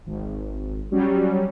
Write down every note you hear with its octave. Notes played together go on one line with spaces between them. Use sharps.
G#1
F#3 G3 C#4